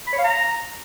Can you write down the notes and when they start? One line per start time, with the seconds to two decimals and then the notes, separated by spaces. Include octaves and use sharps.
0.07 B5
0.13 C#5
0.18 F5
0.24 A#5